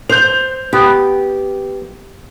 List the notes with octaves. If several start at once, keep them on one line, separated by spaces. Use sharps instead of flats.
C5 G6 F7
B3 G4